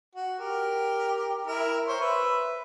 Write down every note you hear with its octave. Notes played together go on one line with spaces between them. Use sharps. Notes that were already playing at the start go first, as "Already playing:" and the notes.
F#4
G4 A#4
E4 A#4
C5 C#5 C6
B4 E5